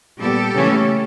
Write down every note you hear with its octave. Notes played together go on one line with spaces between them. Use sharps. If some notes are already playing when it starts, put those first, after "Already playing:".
A#2 G3 B3 G4 A4
C#3 E3 A3 C#4